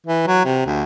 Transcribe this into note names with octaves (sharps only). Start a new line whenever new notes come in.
E3
F#3
C3
D2